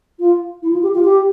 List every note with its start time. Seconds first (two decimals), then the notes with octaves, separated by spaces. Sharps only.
0.19 F4
0.62 E4
0.73 F4
0.82 G4
0.94 F4
1.04 G4